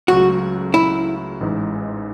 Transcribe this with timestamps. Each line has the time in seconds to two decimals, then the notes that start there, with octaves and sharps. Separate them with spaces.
0.08 C#2 C#3 F#3 A3 F#4
0.74 E4
1.41 A1 G#2 E3 G#3 D#4